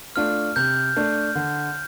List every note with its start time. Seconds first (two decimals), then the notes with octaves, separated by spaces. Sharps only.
0.16 A3 D4 F4 F6
0.56 C3 G6
0.96 A3 D4
1.35 D3